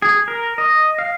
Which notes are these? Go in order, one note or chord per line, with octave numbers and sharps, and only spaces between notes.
G#4
A#4
D#5
F5